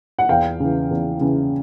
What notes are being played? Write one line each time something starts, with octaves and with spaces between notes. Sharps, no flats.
F#5
E2 F5 G5
C#3 E3
E2
C#3 E3